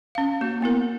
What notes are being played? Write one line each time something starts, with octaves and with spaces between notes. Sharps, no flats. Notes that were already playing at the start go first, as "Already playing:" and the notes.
C#4 F5
A#3 F#4
A#3 B3 E4 A#4